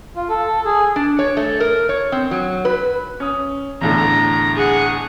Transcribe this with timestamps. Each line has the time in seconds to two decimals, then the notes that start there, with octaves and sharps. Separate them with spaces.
0.16 F4
0.29 A4
0.65 G#4
0.96 D4
1.19 C#5
1.37 A3
1.60 A#4
1.89 C#5
2.12 C4
2.31 F#3
2.65 B4
3.20 C#4 D#6
3.81 E2 A2 D3 A#5
4.55 G#4 F#5